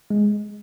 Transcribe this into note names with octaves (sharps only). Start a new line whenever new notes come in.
G#3